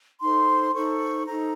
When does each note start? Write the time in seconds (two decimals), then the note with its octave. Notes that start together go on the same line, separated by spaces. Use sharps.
0.21 D#4 A4 C5 C6
0.73 D#4 A4 C5 C#6
1.25 D#4 A4 C5 A#5